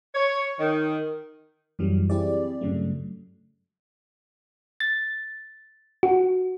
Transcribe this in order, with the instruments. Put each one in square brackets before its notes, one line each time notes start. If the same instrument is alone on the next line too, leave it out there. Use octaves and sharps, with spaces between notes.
[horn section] C#5
D#3
[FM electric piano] F#2 E3 F#3 G3
C4 E4 G4 G#4 D5
G2 C#3 F#3 A3
[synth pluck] A6
F#4